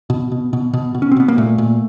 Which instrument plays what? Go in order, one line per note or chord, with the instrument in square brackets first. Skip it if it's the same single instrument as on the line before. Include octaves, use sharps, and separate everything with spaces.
[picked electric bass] B2
B2
B2
B2
B2
C#4
C4
B2 B3
A#3
A#2 A3
A#2